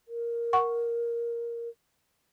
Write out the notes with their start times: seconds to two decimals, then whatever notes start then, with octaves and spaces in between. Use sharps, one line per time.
0.08 A#4
0.53 F#5 C#6